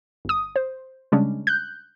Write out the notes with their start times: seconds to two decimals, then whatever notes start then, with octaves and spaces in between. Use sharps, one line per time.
0.25 G1 D#6
0.56 C5
1.12 C#3 G3 G#3 C#4 D4
1.47 F#6 G6